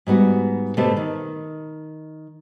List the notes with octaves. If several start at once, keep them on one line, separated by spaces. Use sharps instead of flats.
G#2 G3 B3 F#4
B2 D3 A3 G4 A4 C5
D#3